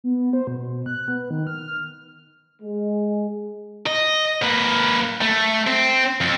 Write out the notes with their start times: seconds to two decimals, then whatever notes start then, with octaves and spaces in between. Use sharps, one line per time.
0.04 B3
0.33 C5
0.47 B2
0.86 F#6
1.08 B3
1.30 D#3
1.47 F6
2.62 G#3
3.86 D#5
4.43 A#3 B4
5.21 A3
5.67 C4
6.21 F2